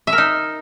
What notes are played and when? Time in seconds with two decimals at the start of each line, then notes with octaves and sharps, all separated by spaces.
0.07 E5
0.13 A#4
0.18 D#4